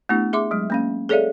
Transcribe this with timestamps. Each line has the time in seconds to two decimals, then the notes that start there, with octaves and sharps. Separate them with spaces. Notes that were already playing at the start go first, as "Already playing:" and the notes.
0.09 A3 B3 D4 E4 G4
0.33 G#4 E5 C6 D6
0.51 F#3 G#3
0.70 A#3 C#4 F5
1.09 G#4 A4 C#5 D5 E5 F5